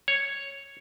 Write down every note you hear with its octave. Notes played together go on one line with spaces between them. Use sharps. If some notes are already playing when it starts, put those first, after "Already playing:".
C#5